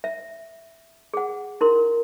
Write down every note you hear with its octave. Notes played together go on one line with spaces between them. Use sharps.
E5
G#4 F#5
E4 A#4 C6